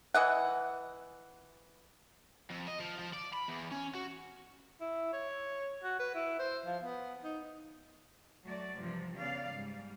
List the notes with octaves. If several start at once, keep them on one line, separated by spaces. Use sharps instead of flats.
E3 D#5 F#5
F2
D#5
F3
F3
D5
B5
E2
C#4
F#4
E4
C#5
F#4
B4
E4
C5
F3
B3
D#4
F#3 A3 F#4 D5
G2 C3 E3 F3
C#3 B3 D5 F5
G#2 G3